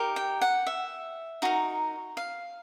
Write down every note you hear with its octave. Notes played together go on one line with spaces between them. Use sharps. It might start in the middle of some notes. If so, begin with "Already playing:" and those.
Already playing: D#4 G4 A#4
G5
F#5
E5
D#4 F#4 A#4
F5